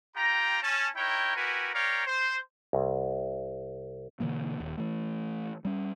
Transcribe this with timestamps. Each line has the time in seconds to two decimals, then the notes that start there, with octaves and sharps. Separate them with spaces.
0.16 F4 G4 G5 A#5
0.62 C#4 A5
0.96 D#4 E4 A#4 C#5 G5
1.36 E4 F#4 G4 A#4 B4 G#5
1.73 A#4 C#5 D5 F5 G5 A#5
2.06 C5
2.73 C2
4.20 B2 D3 E3 A#3
4.60 D#1 D#2
4.78 E3 A3
5.65 G3 C#4